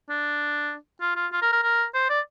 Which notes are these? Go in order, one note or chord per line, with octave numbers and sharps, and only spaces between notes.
D4
F4
F4
F4
A#4
A#4
A#4
C5
D5